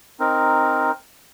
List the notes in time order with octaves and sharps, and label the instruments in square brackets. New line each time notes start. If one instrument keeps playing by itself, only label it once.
[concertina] C4 D#4 A#4